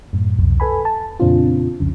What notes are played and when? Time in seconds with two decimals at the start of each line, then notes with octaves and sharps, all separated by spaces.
0.13 F#2 A2
0.39 C2 F2 B2
0.60 A4 B4 G#5 B5
0.85 A5
1.20 F2 A#2 C#3 C4 D4 F4
1.80 C2 F2 C#3